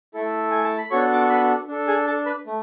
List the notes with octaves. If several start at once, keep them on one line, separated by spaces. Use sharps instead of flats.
A3 E4 A4
G#5
A5
B5
B3 D4 F#4 A4 C#5 C#6
D6
C#6
B4 B5
D4 A4
G#4 G#5
A4 A5
B4 B5
A3